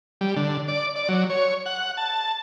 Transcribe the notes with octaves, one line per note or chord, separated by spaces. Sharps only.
G3
D3
D5
D5
F#3
C#5
F#5
A5